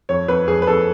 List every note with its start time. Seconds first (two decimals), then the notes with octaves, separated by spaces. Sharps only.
0.09 F2 C#5
0.28 F2 B4
0.48 F2 G#4
0.62 B4
0.67 F2 A4